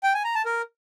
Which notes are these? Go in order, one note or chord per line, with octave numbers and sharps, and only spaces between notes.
G5
G#5
A#5
A5
A#4